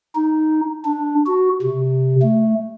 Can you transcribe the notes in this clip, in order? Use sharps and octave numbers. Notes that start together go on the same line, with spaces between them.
D#4
D4
F#4
C3
A3